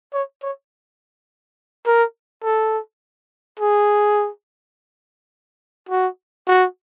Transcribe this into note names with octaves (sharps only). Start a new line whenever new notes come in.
C#5
C#5
A#4
A4
G#4
F#4
F#4